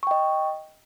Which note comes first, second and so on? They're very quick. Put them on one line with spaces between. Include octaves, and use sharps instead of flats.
C#6 G5 D#5